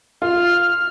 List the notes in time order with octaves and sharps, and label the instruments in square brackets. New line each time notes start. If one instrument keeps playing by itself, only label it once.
[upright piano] F4 [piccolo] F6